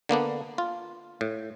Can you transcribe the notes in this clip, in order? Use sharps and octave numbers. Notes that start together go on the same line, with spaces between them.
D3 A#3 B3 D4
F4
A2